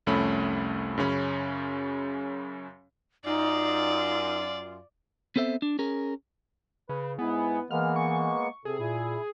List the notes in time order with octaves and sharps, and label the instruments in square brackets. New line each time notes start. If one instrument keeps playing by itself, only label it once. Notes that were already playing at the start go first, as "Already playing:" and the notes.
[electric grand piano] C2 F2 A3 C#4 B5
F#2 C#3 C#4 B5
[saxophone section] F#2 F4 [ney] D#4 [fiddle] D5
[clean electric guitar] B3 C4 A4 C5 E5
D4
C#4 G#4 A#4
[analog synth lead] C#3 [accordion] B4
[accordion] G#2 G#4 [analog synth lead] B3 [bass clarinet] E4
[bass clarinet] E3 [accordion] G#3 A#3 B3 [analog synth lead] F6
[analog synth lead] C#6
[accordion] C3 [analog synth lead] G#4 [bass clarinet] A4
[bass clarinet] A#2 [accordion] E4